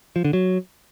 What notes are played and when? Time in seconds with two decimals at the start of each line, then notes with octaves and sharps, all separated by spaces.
0.16 F3
0.25 D3
0.33 F#3